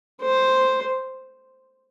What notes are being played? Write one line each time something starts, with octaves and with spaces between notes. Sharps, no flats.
C5